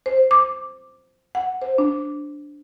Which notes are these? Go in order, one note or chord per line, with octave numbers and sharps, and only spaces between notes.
C5
D6
F#5
C5
D4